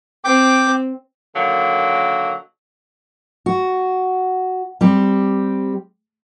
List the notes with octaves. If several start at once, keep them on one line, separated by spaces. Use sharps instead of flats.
C4 G5 D6
D3 D#3 F#3 A#3
F#4
G3 C4 G4